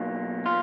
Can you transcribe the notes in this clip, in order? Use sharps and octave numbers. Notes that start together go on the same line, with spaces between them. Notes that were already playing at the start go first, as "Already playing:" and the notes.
Already playing: B1 B2 F#3 A#3
F4